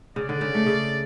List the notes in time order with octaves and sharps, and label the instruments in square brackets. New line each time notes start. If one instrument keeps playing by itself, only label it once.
[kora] C#3 [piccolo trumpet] D5
[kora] D3
C#3
A3
C#3